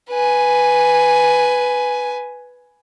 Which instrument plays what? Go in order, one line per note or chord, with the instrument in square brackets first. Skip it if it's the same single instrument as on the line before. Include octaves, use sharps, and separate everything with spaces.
[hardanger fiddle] B4 G#5